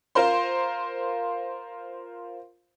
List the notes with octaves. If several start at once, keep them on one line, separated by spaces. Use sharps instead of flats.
F4 A#4 C5 C6